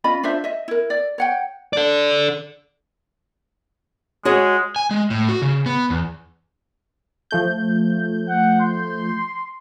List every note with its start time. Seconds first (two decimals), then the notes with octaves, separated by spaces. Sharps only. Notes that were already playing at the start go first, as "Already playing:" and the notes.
0.04 C#4 F4 D#5 B5
0.23 D4 F4 C5 E5
0.44 D#5 E5
0.68 E4 A#4
0.90 D5
1.18 C#5 F#5 G5
1.73 A4 D5
4.25 G#3 F#4 G#4 C#5
4.76 G#5
4.91 G#3
5.10 A2
5.29 F#4
5.42 C#3
5.66 B3
5.90 E2
7.31 F3 A3 G6
8.29 F#5
8.61 C6